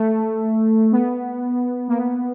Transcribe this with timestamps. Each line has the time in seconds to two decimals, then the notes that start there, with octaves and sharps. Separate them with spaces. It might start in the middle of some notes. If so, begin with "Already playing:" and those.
Already playing: A3
0.92 B3
1.88 A#3
1.98 B3